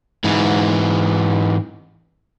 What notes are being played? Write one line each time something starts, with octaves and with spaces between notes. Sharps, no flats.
G#2 E3